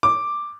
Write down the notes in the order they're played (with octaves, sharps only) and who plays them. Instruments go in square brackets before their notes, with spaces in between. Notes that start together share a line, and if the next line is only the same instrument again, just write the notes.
[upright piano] D6